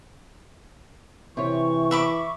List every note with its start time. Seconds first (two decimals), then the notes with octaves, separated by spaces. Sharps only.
1.37 C3 E3 C#5 C#6
1.91 E5 B5 D6